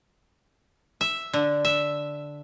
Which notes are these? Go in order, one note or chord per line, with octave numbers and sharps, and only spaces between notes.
E5
D3
E5